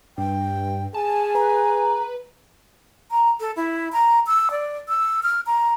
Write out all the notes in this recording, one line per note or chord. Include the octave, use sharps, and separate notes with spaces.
G2 G5
G#4 G#5 A5
B4 A#5
A#5
A4
E4
A#5
E6
D5
E6
F6
A#5